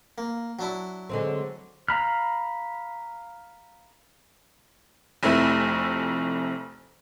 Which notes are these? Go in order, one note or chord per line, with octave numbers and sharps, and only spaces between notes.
A#3
F#3 D4 E4
D3 G#3 C4
F5 A#5 B5 F6
F1 F2 A3 E4